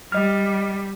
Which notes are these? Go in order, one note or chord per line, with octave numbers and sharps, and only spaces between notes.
G3 D#5 F6